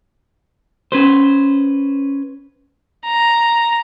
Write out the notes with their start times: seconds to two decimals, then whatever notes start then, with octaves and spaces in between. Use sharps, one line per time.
0.92 C#4 B4 C5
3.06 A#5